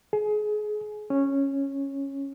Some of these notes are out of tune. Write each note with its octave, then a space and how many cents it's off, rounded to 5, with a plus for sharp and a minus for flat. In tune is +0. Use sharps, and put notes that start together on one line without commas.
G#4 +25
C#4 -10